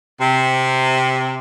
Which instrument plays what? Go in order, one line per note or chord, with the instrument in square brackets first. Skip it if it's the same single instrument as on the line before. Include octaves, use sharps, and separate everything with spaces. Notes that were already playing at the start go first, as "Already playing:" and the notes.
[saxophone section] C3